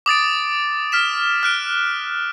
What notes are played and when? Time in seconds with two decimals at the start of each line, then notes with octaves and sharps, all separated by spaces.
0.06 D6 D#6 A6 D7
0.92 F6 B6 E7
1.43 F6 F#6 D7